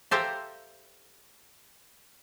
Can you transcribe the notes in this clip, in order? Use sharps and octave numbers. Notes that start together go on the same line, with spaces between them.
G4 A4 C5 E5 F5 A#5